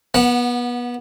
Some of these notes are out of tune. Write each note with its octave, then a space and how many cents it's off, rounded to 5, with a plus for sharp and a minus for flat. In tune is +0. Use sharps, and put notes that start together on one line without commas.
B3 -25 F#5 +0